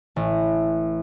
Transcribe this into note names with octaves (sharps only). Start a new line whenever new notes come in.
A1